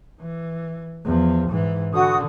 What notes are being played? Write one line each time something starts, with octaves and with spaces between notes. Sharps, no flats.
E3
E2 F3
G#2 E3
D3 F#4 D#6